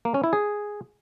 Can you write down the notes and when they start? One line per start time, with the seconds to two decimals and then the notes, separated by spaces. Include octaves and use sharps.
0.05 A#3
0.14 C#4
0.24 E4
0.33 G#4